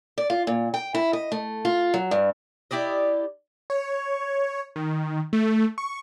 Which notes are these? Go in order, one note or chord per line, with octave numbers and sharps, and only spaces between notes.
D5
F4
A#2
G5
E4
D#5
A3
F4
F#3
G2
E4 G4 D5 D#5
C#5
D#3
A3
C#6